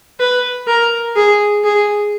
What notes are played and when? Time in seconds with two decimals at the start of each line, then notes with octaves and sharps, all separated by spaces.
0.20 B4
0.67 A#4
1.16 G#4
1.64 G#4